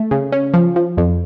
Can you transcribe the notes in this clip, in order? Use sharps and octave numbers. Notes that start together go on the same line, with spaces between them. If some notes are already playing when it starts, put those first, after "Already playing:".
Already playing: A3
C#3
C#4
F3
F3
F2